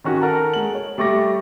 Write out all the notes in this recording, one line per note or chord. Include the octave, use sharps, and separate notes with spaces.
D#3 C#4 F#4
A4 A#4 F#5 A5 A#5
G#3 F#7
C#5
G3 A3 C#6 D6 A#6